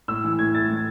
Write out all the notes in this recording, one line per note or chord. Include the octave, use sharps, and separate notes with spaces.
A2 E6
E3
A2 G#6
A3 A6
A2